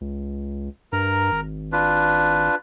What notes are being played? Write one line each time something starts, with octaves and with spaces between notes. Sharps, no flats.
C#2
G2 A#4 A#5
G#1
D4 F4 B4